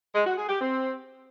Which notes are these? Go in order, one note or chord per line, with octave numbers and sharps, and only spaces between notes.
G#3
F#4
G#4
G4
C4